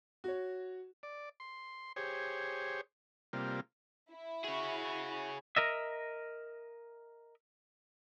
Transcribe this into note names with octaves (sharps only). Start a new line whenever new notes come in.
F#4 C#5
D5
C6
G4 G#4 C5 C#5
C3 G3 A#3 F4
E4
F#4 G#4 C#5
A#4 D#5 E5